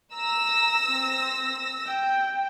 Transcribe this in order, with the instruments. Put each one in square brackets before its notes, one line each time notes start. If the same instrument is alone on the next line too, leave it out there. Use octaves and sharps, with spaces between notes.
[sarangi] A#5 [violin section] E6 A#6
[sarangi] C4
G5